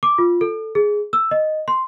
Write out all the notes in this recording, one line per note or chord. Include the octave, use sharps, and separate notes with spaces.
D6
F4
A4
G#4
E6
D#5
C6